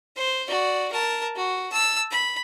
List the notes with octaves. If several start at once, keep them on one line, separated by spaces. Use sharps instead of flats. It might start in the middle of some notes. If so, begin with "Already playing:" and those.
C5
F#4 D5
A#4 A5
F#4
A5 E6
B5